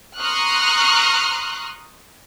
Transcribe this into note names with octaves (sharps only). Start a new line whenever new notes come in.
A#5 C6 C#6 D#6 F6 F#6